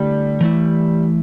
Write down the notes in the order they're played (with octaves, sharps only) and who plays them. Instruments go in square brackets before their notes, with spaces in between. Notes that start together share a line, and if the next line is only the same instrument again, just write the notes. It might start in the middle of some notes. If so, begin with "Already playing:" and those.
Already playing: [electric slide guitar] D3 A3 E4 [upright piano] G3
[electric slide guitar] E3 A3 E4